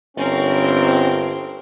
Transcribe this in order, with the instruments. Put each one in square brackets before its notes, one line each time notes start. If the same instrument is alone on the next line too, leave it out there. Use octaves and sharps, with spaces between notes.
[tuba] G1 [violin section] C4 A#4 [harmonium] C#4